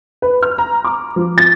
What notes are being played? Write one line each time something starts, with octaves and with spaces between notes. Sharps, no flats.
B4
F6
A#5
D6
F3
A6